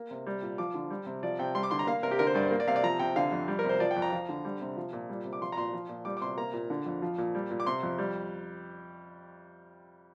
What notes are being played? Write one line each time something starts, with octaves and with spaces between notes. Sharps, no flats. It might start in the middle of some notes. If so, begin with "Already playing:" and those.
Already playing: A#3
C3
G3
A#2
F3 D6
D3
G3
C3
F3 D5
C3 G5
G3 C6
D6
D3 C6
A#5
A#3 F5
C3 A#4
G4
D3 A#4
C5
G2 D5
C5
A#3
D5
C3 F5
D5
F3 A#5
C3 G5
D3 F5
F2
G3
A#4
C3 C5
F3 D5
G5
F2
A#5
F3
D3
G3
C3
F3
A#2
G3
C3
D6
F3 C6
A#5
A#2 C6
F3
A#2
G3 D6
D6
C3 C6
A#3 A#5
A#2
D3
F2
F3
A#2
G3
A#2
D6
C3 C6
F2
G3